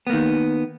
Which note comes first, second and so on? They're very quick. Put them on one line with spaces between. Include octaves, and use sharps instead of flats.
B3 A#3 D#3